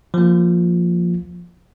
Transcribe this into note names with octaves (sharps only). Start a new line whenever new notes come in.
F3 A#3